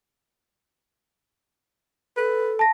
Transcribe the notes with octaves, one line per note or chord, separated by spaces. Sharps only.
A4 B4
A5 A#6